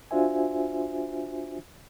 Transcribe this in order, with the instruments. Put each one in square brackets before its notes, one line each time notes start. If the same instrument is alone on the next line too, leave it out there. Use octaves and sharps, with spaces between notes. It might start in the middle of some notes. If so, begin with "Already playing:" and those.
[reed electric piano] D4 F4 F#4 C5 E5 G#5